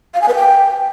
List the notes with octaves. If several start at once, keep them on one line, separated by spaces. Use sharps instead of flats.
F5
G#5
B4
G5